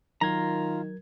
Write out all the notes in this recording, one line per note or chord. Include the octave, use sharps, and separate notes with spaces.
D#3 F#3 F4 A#4 A#5 G#6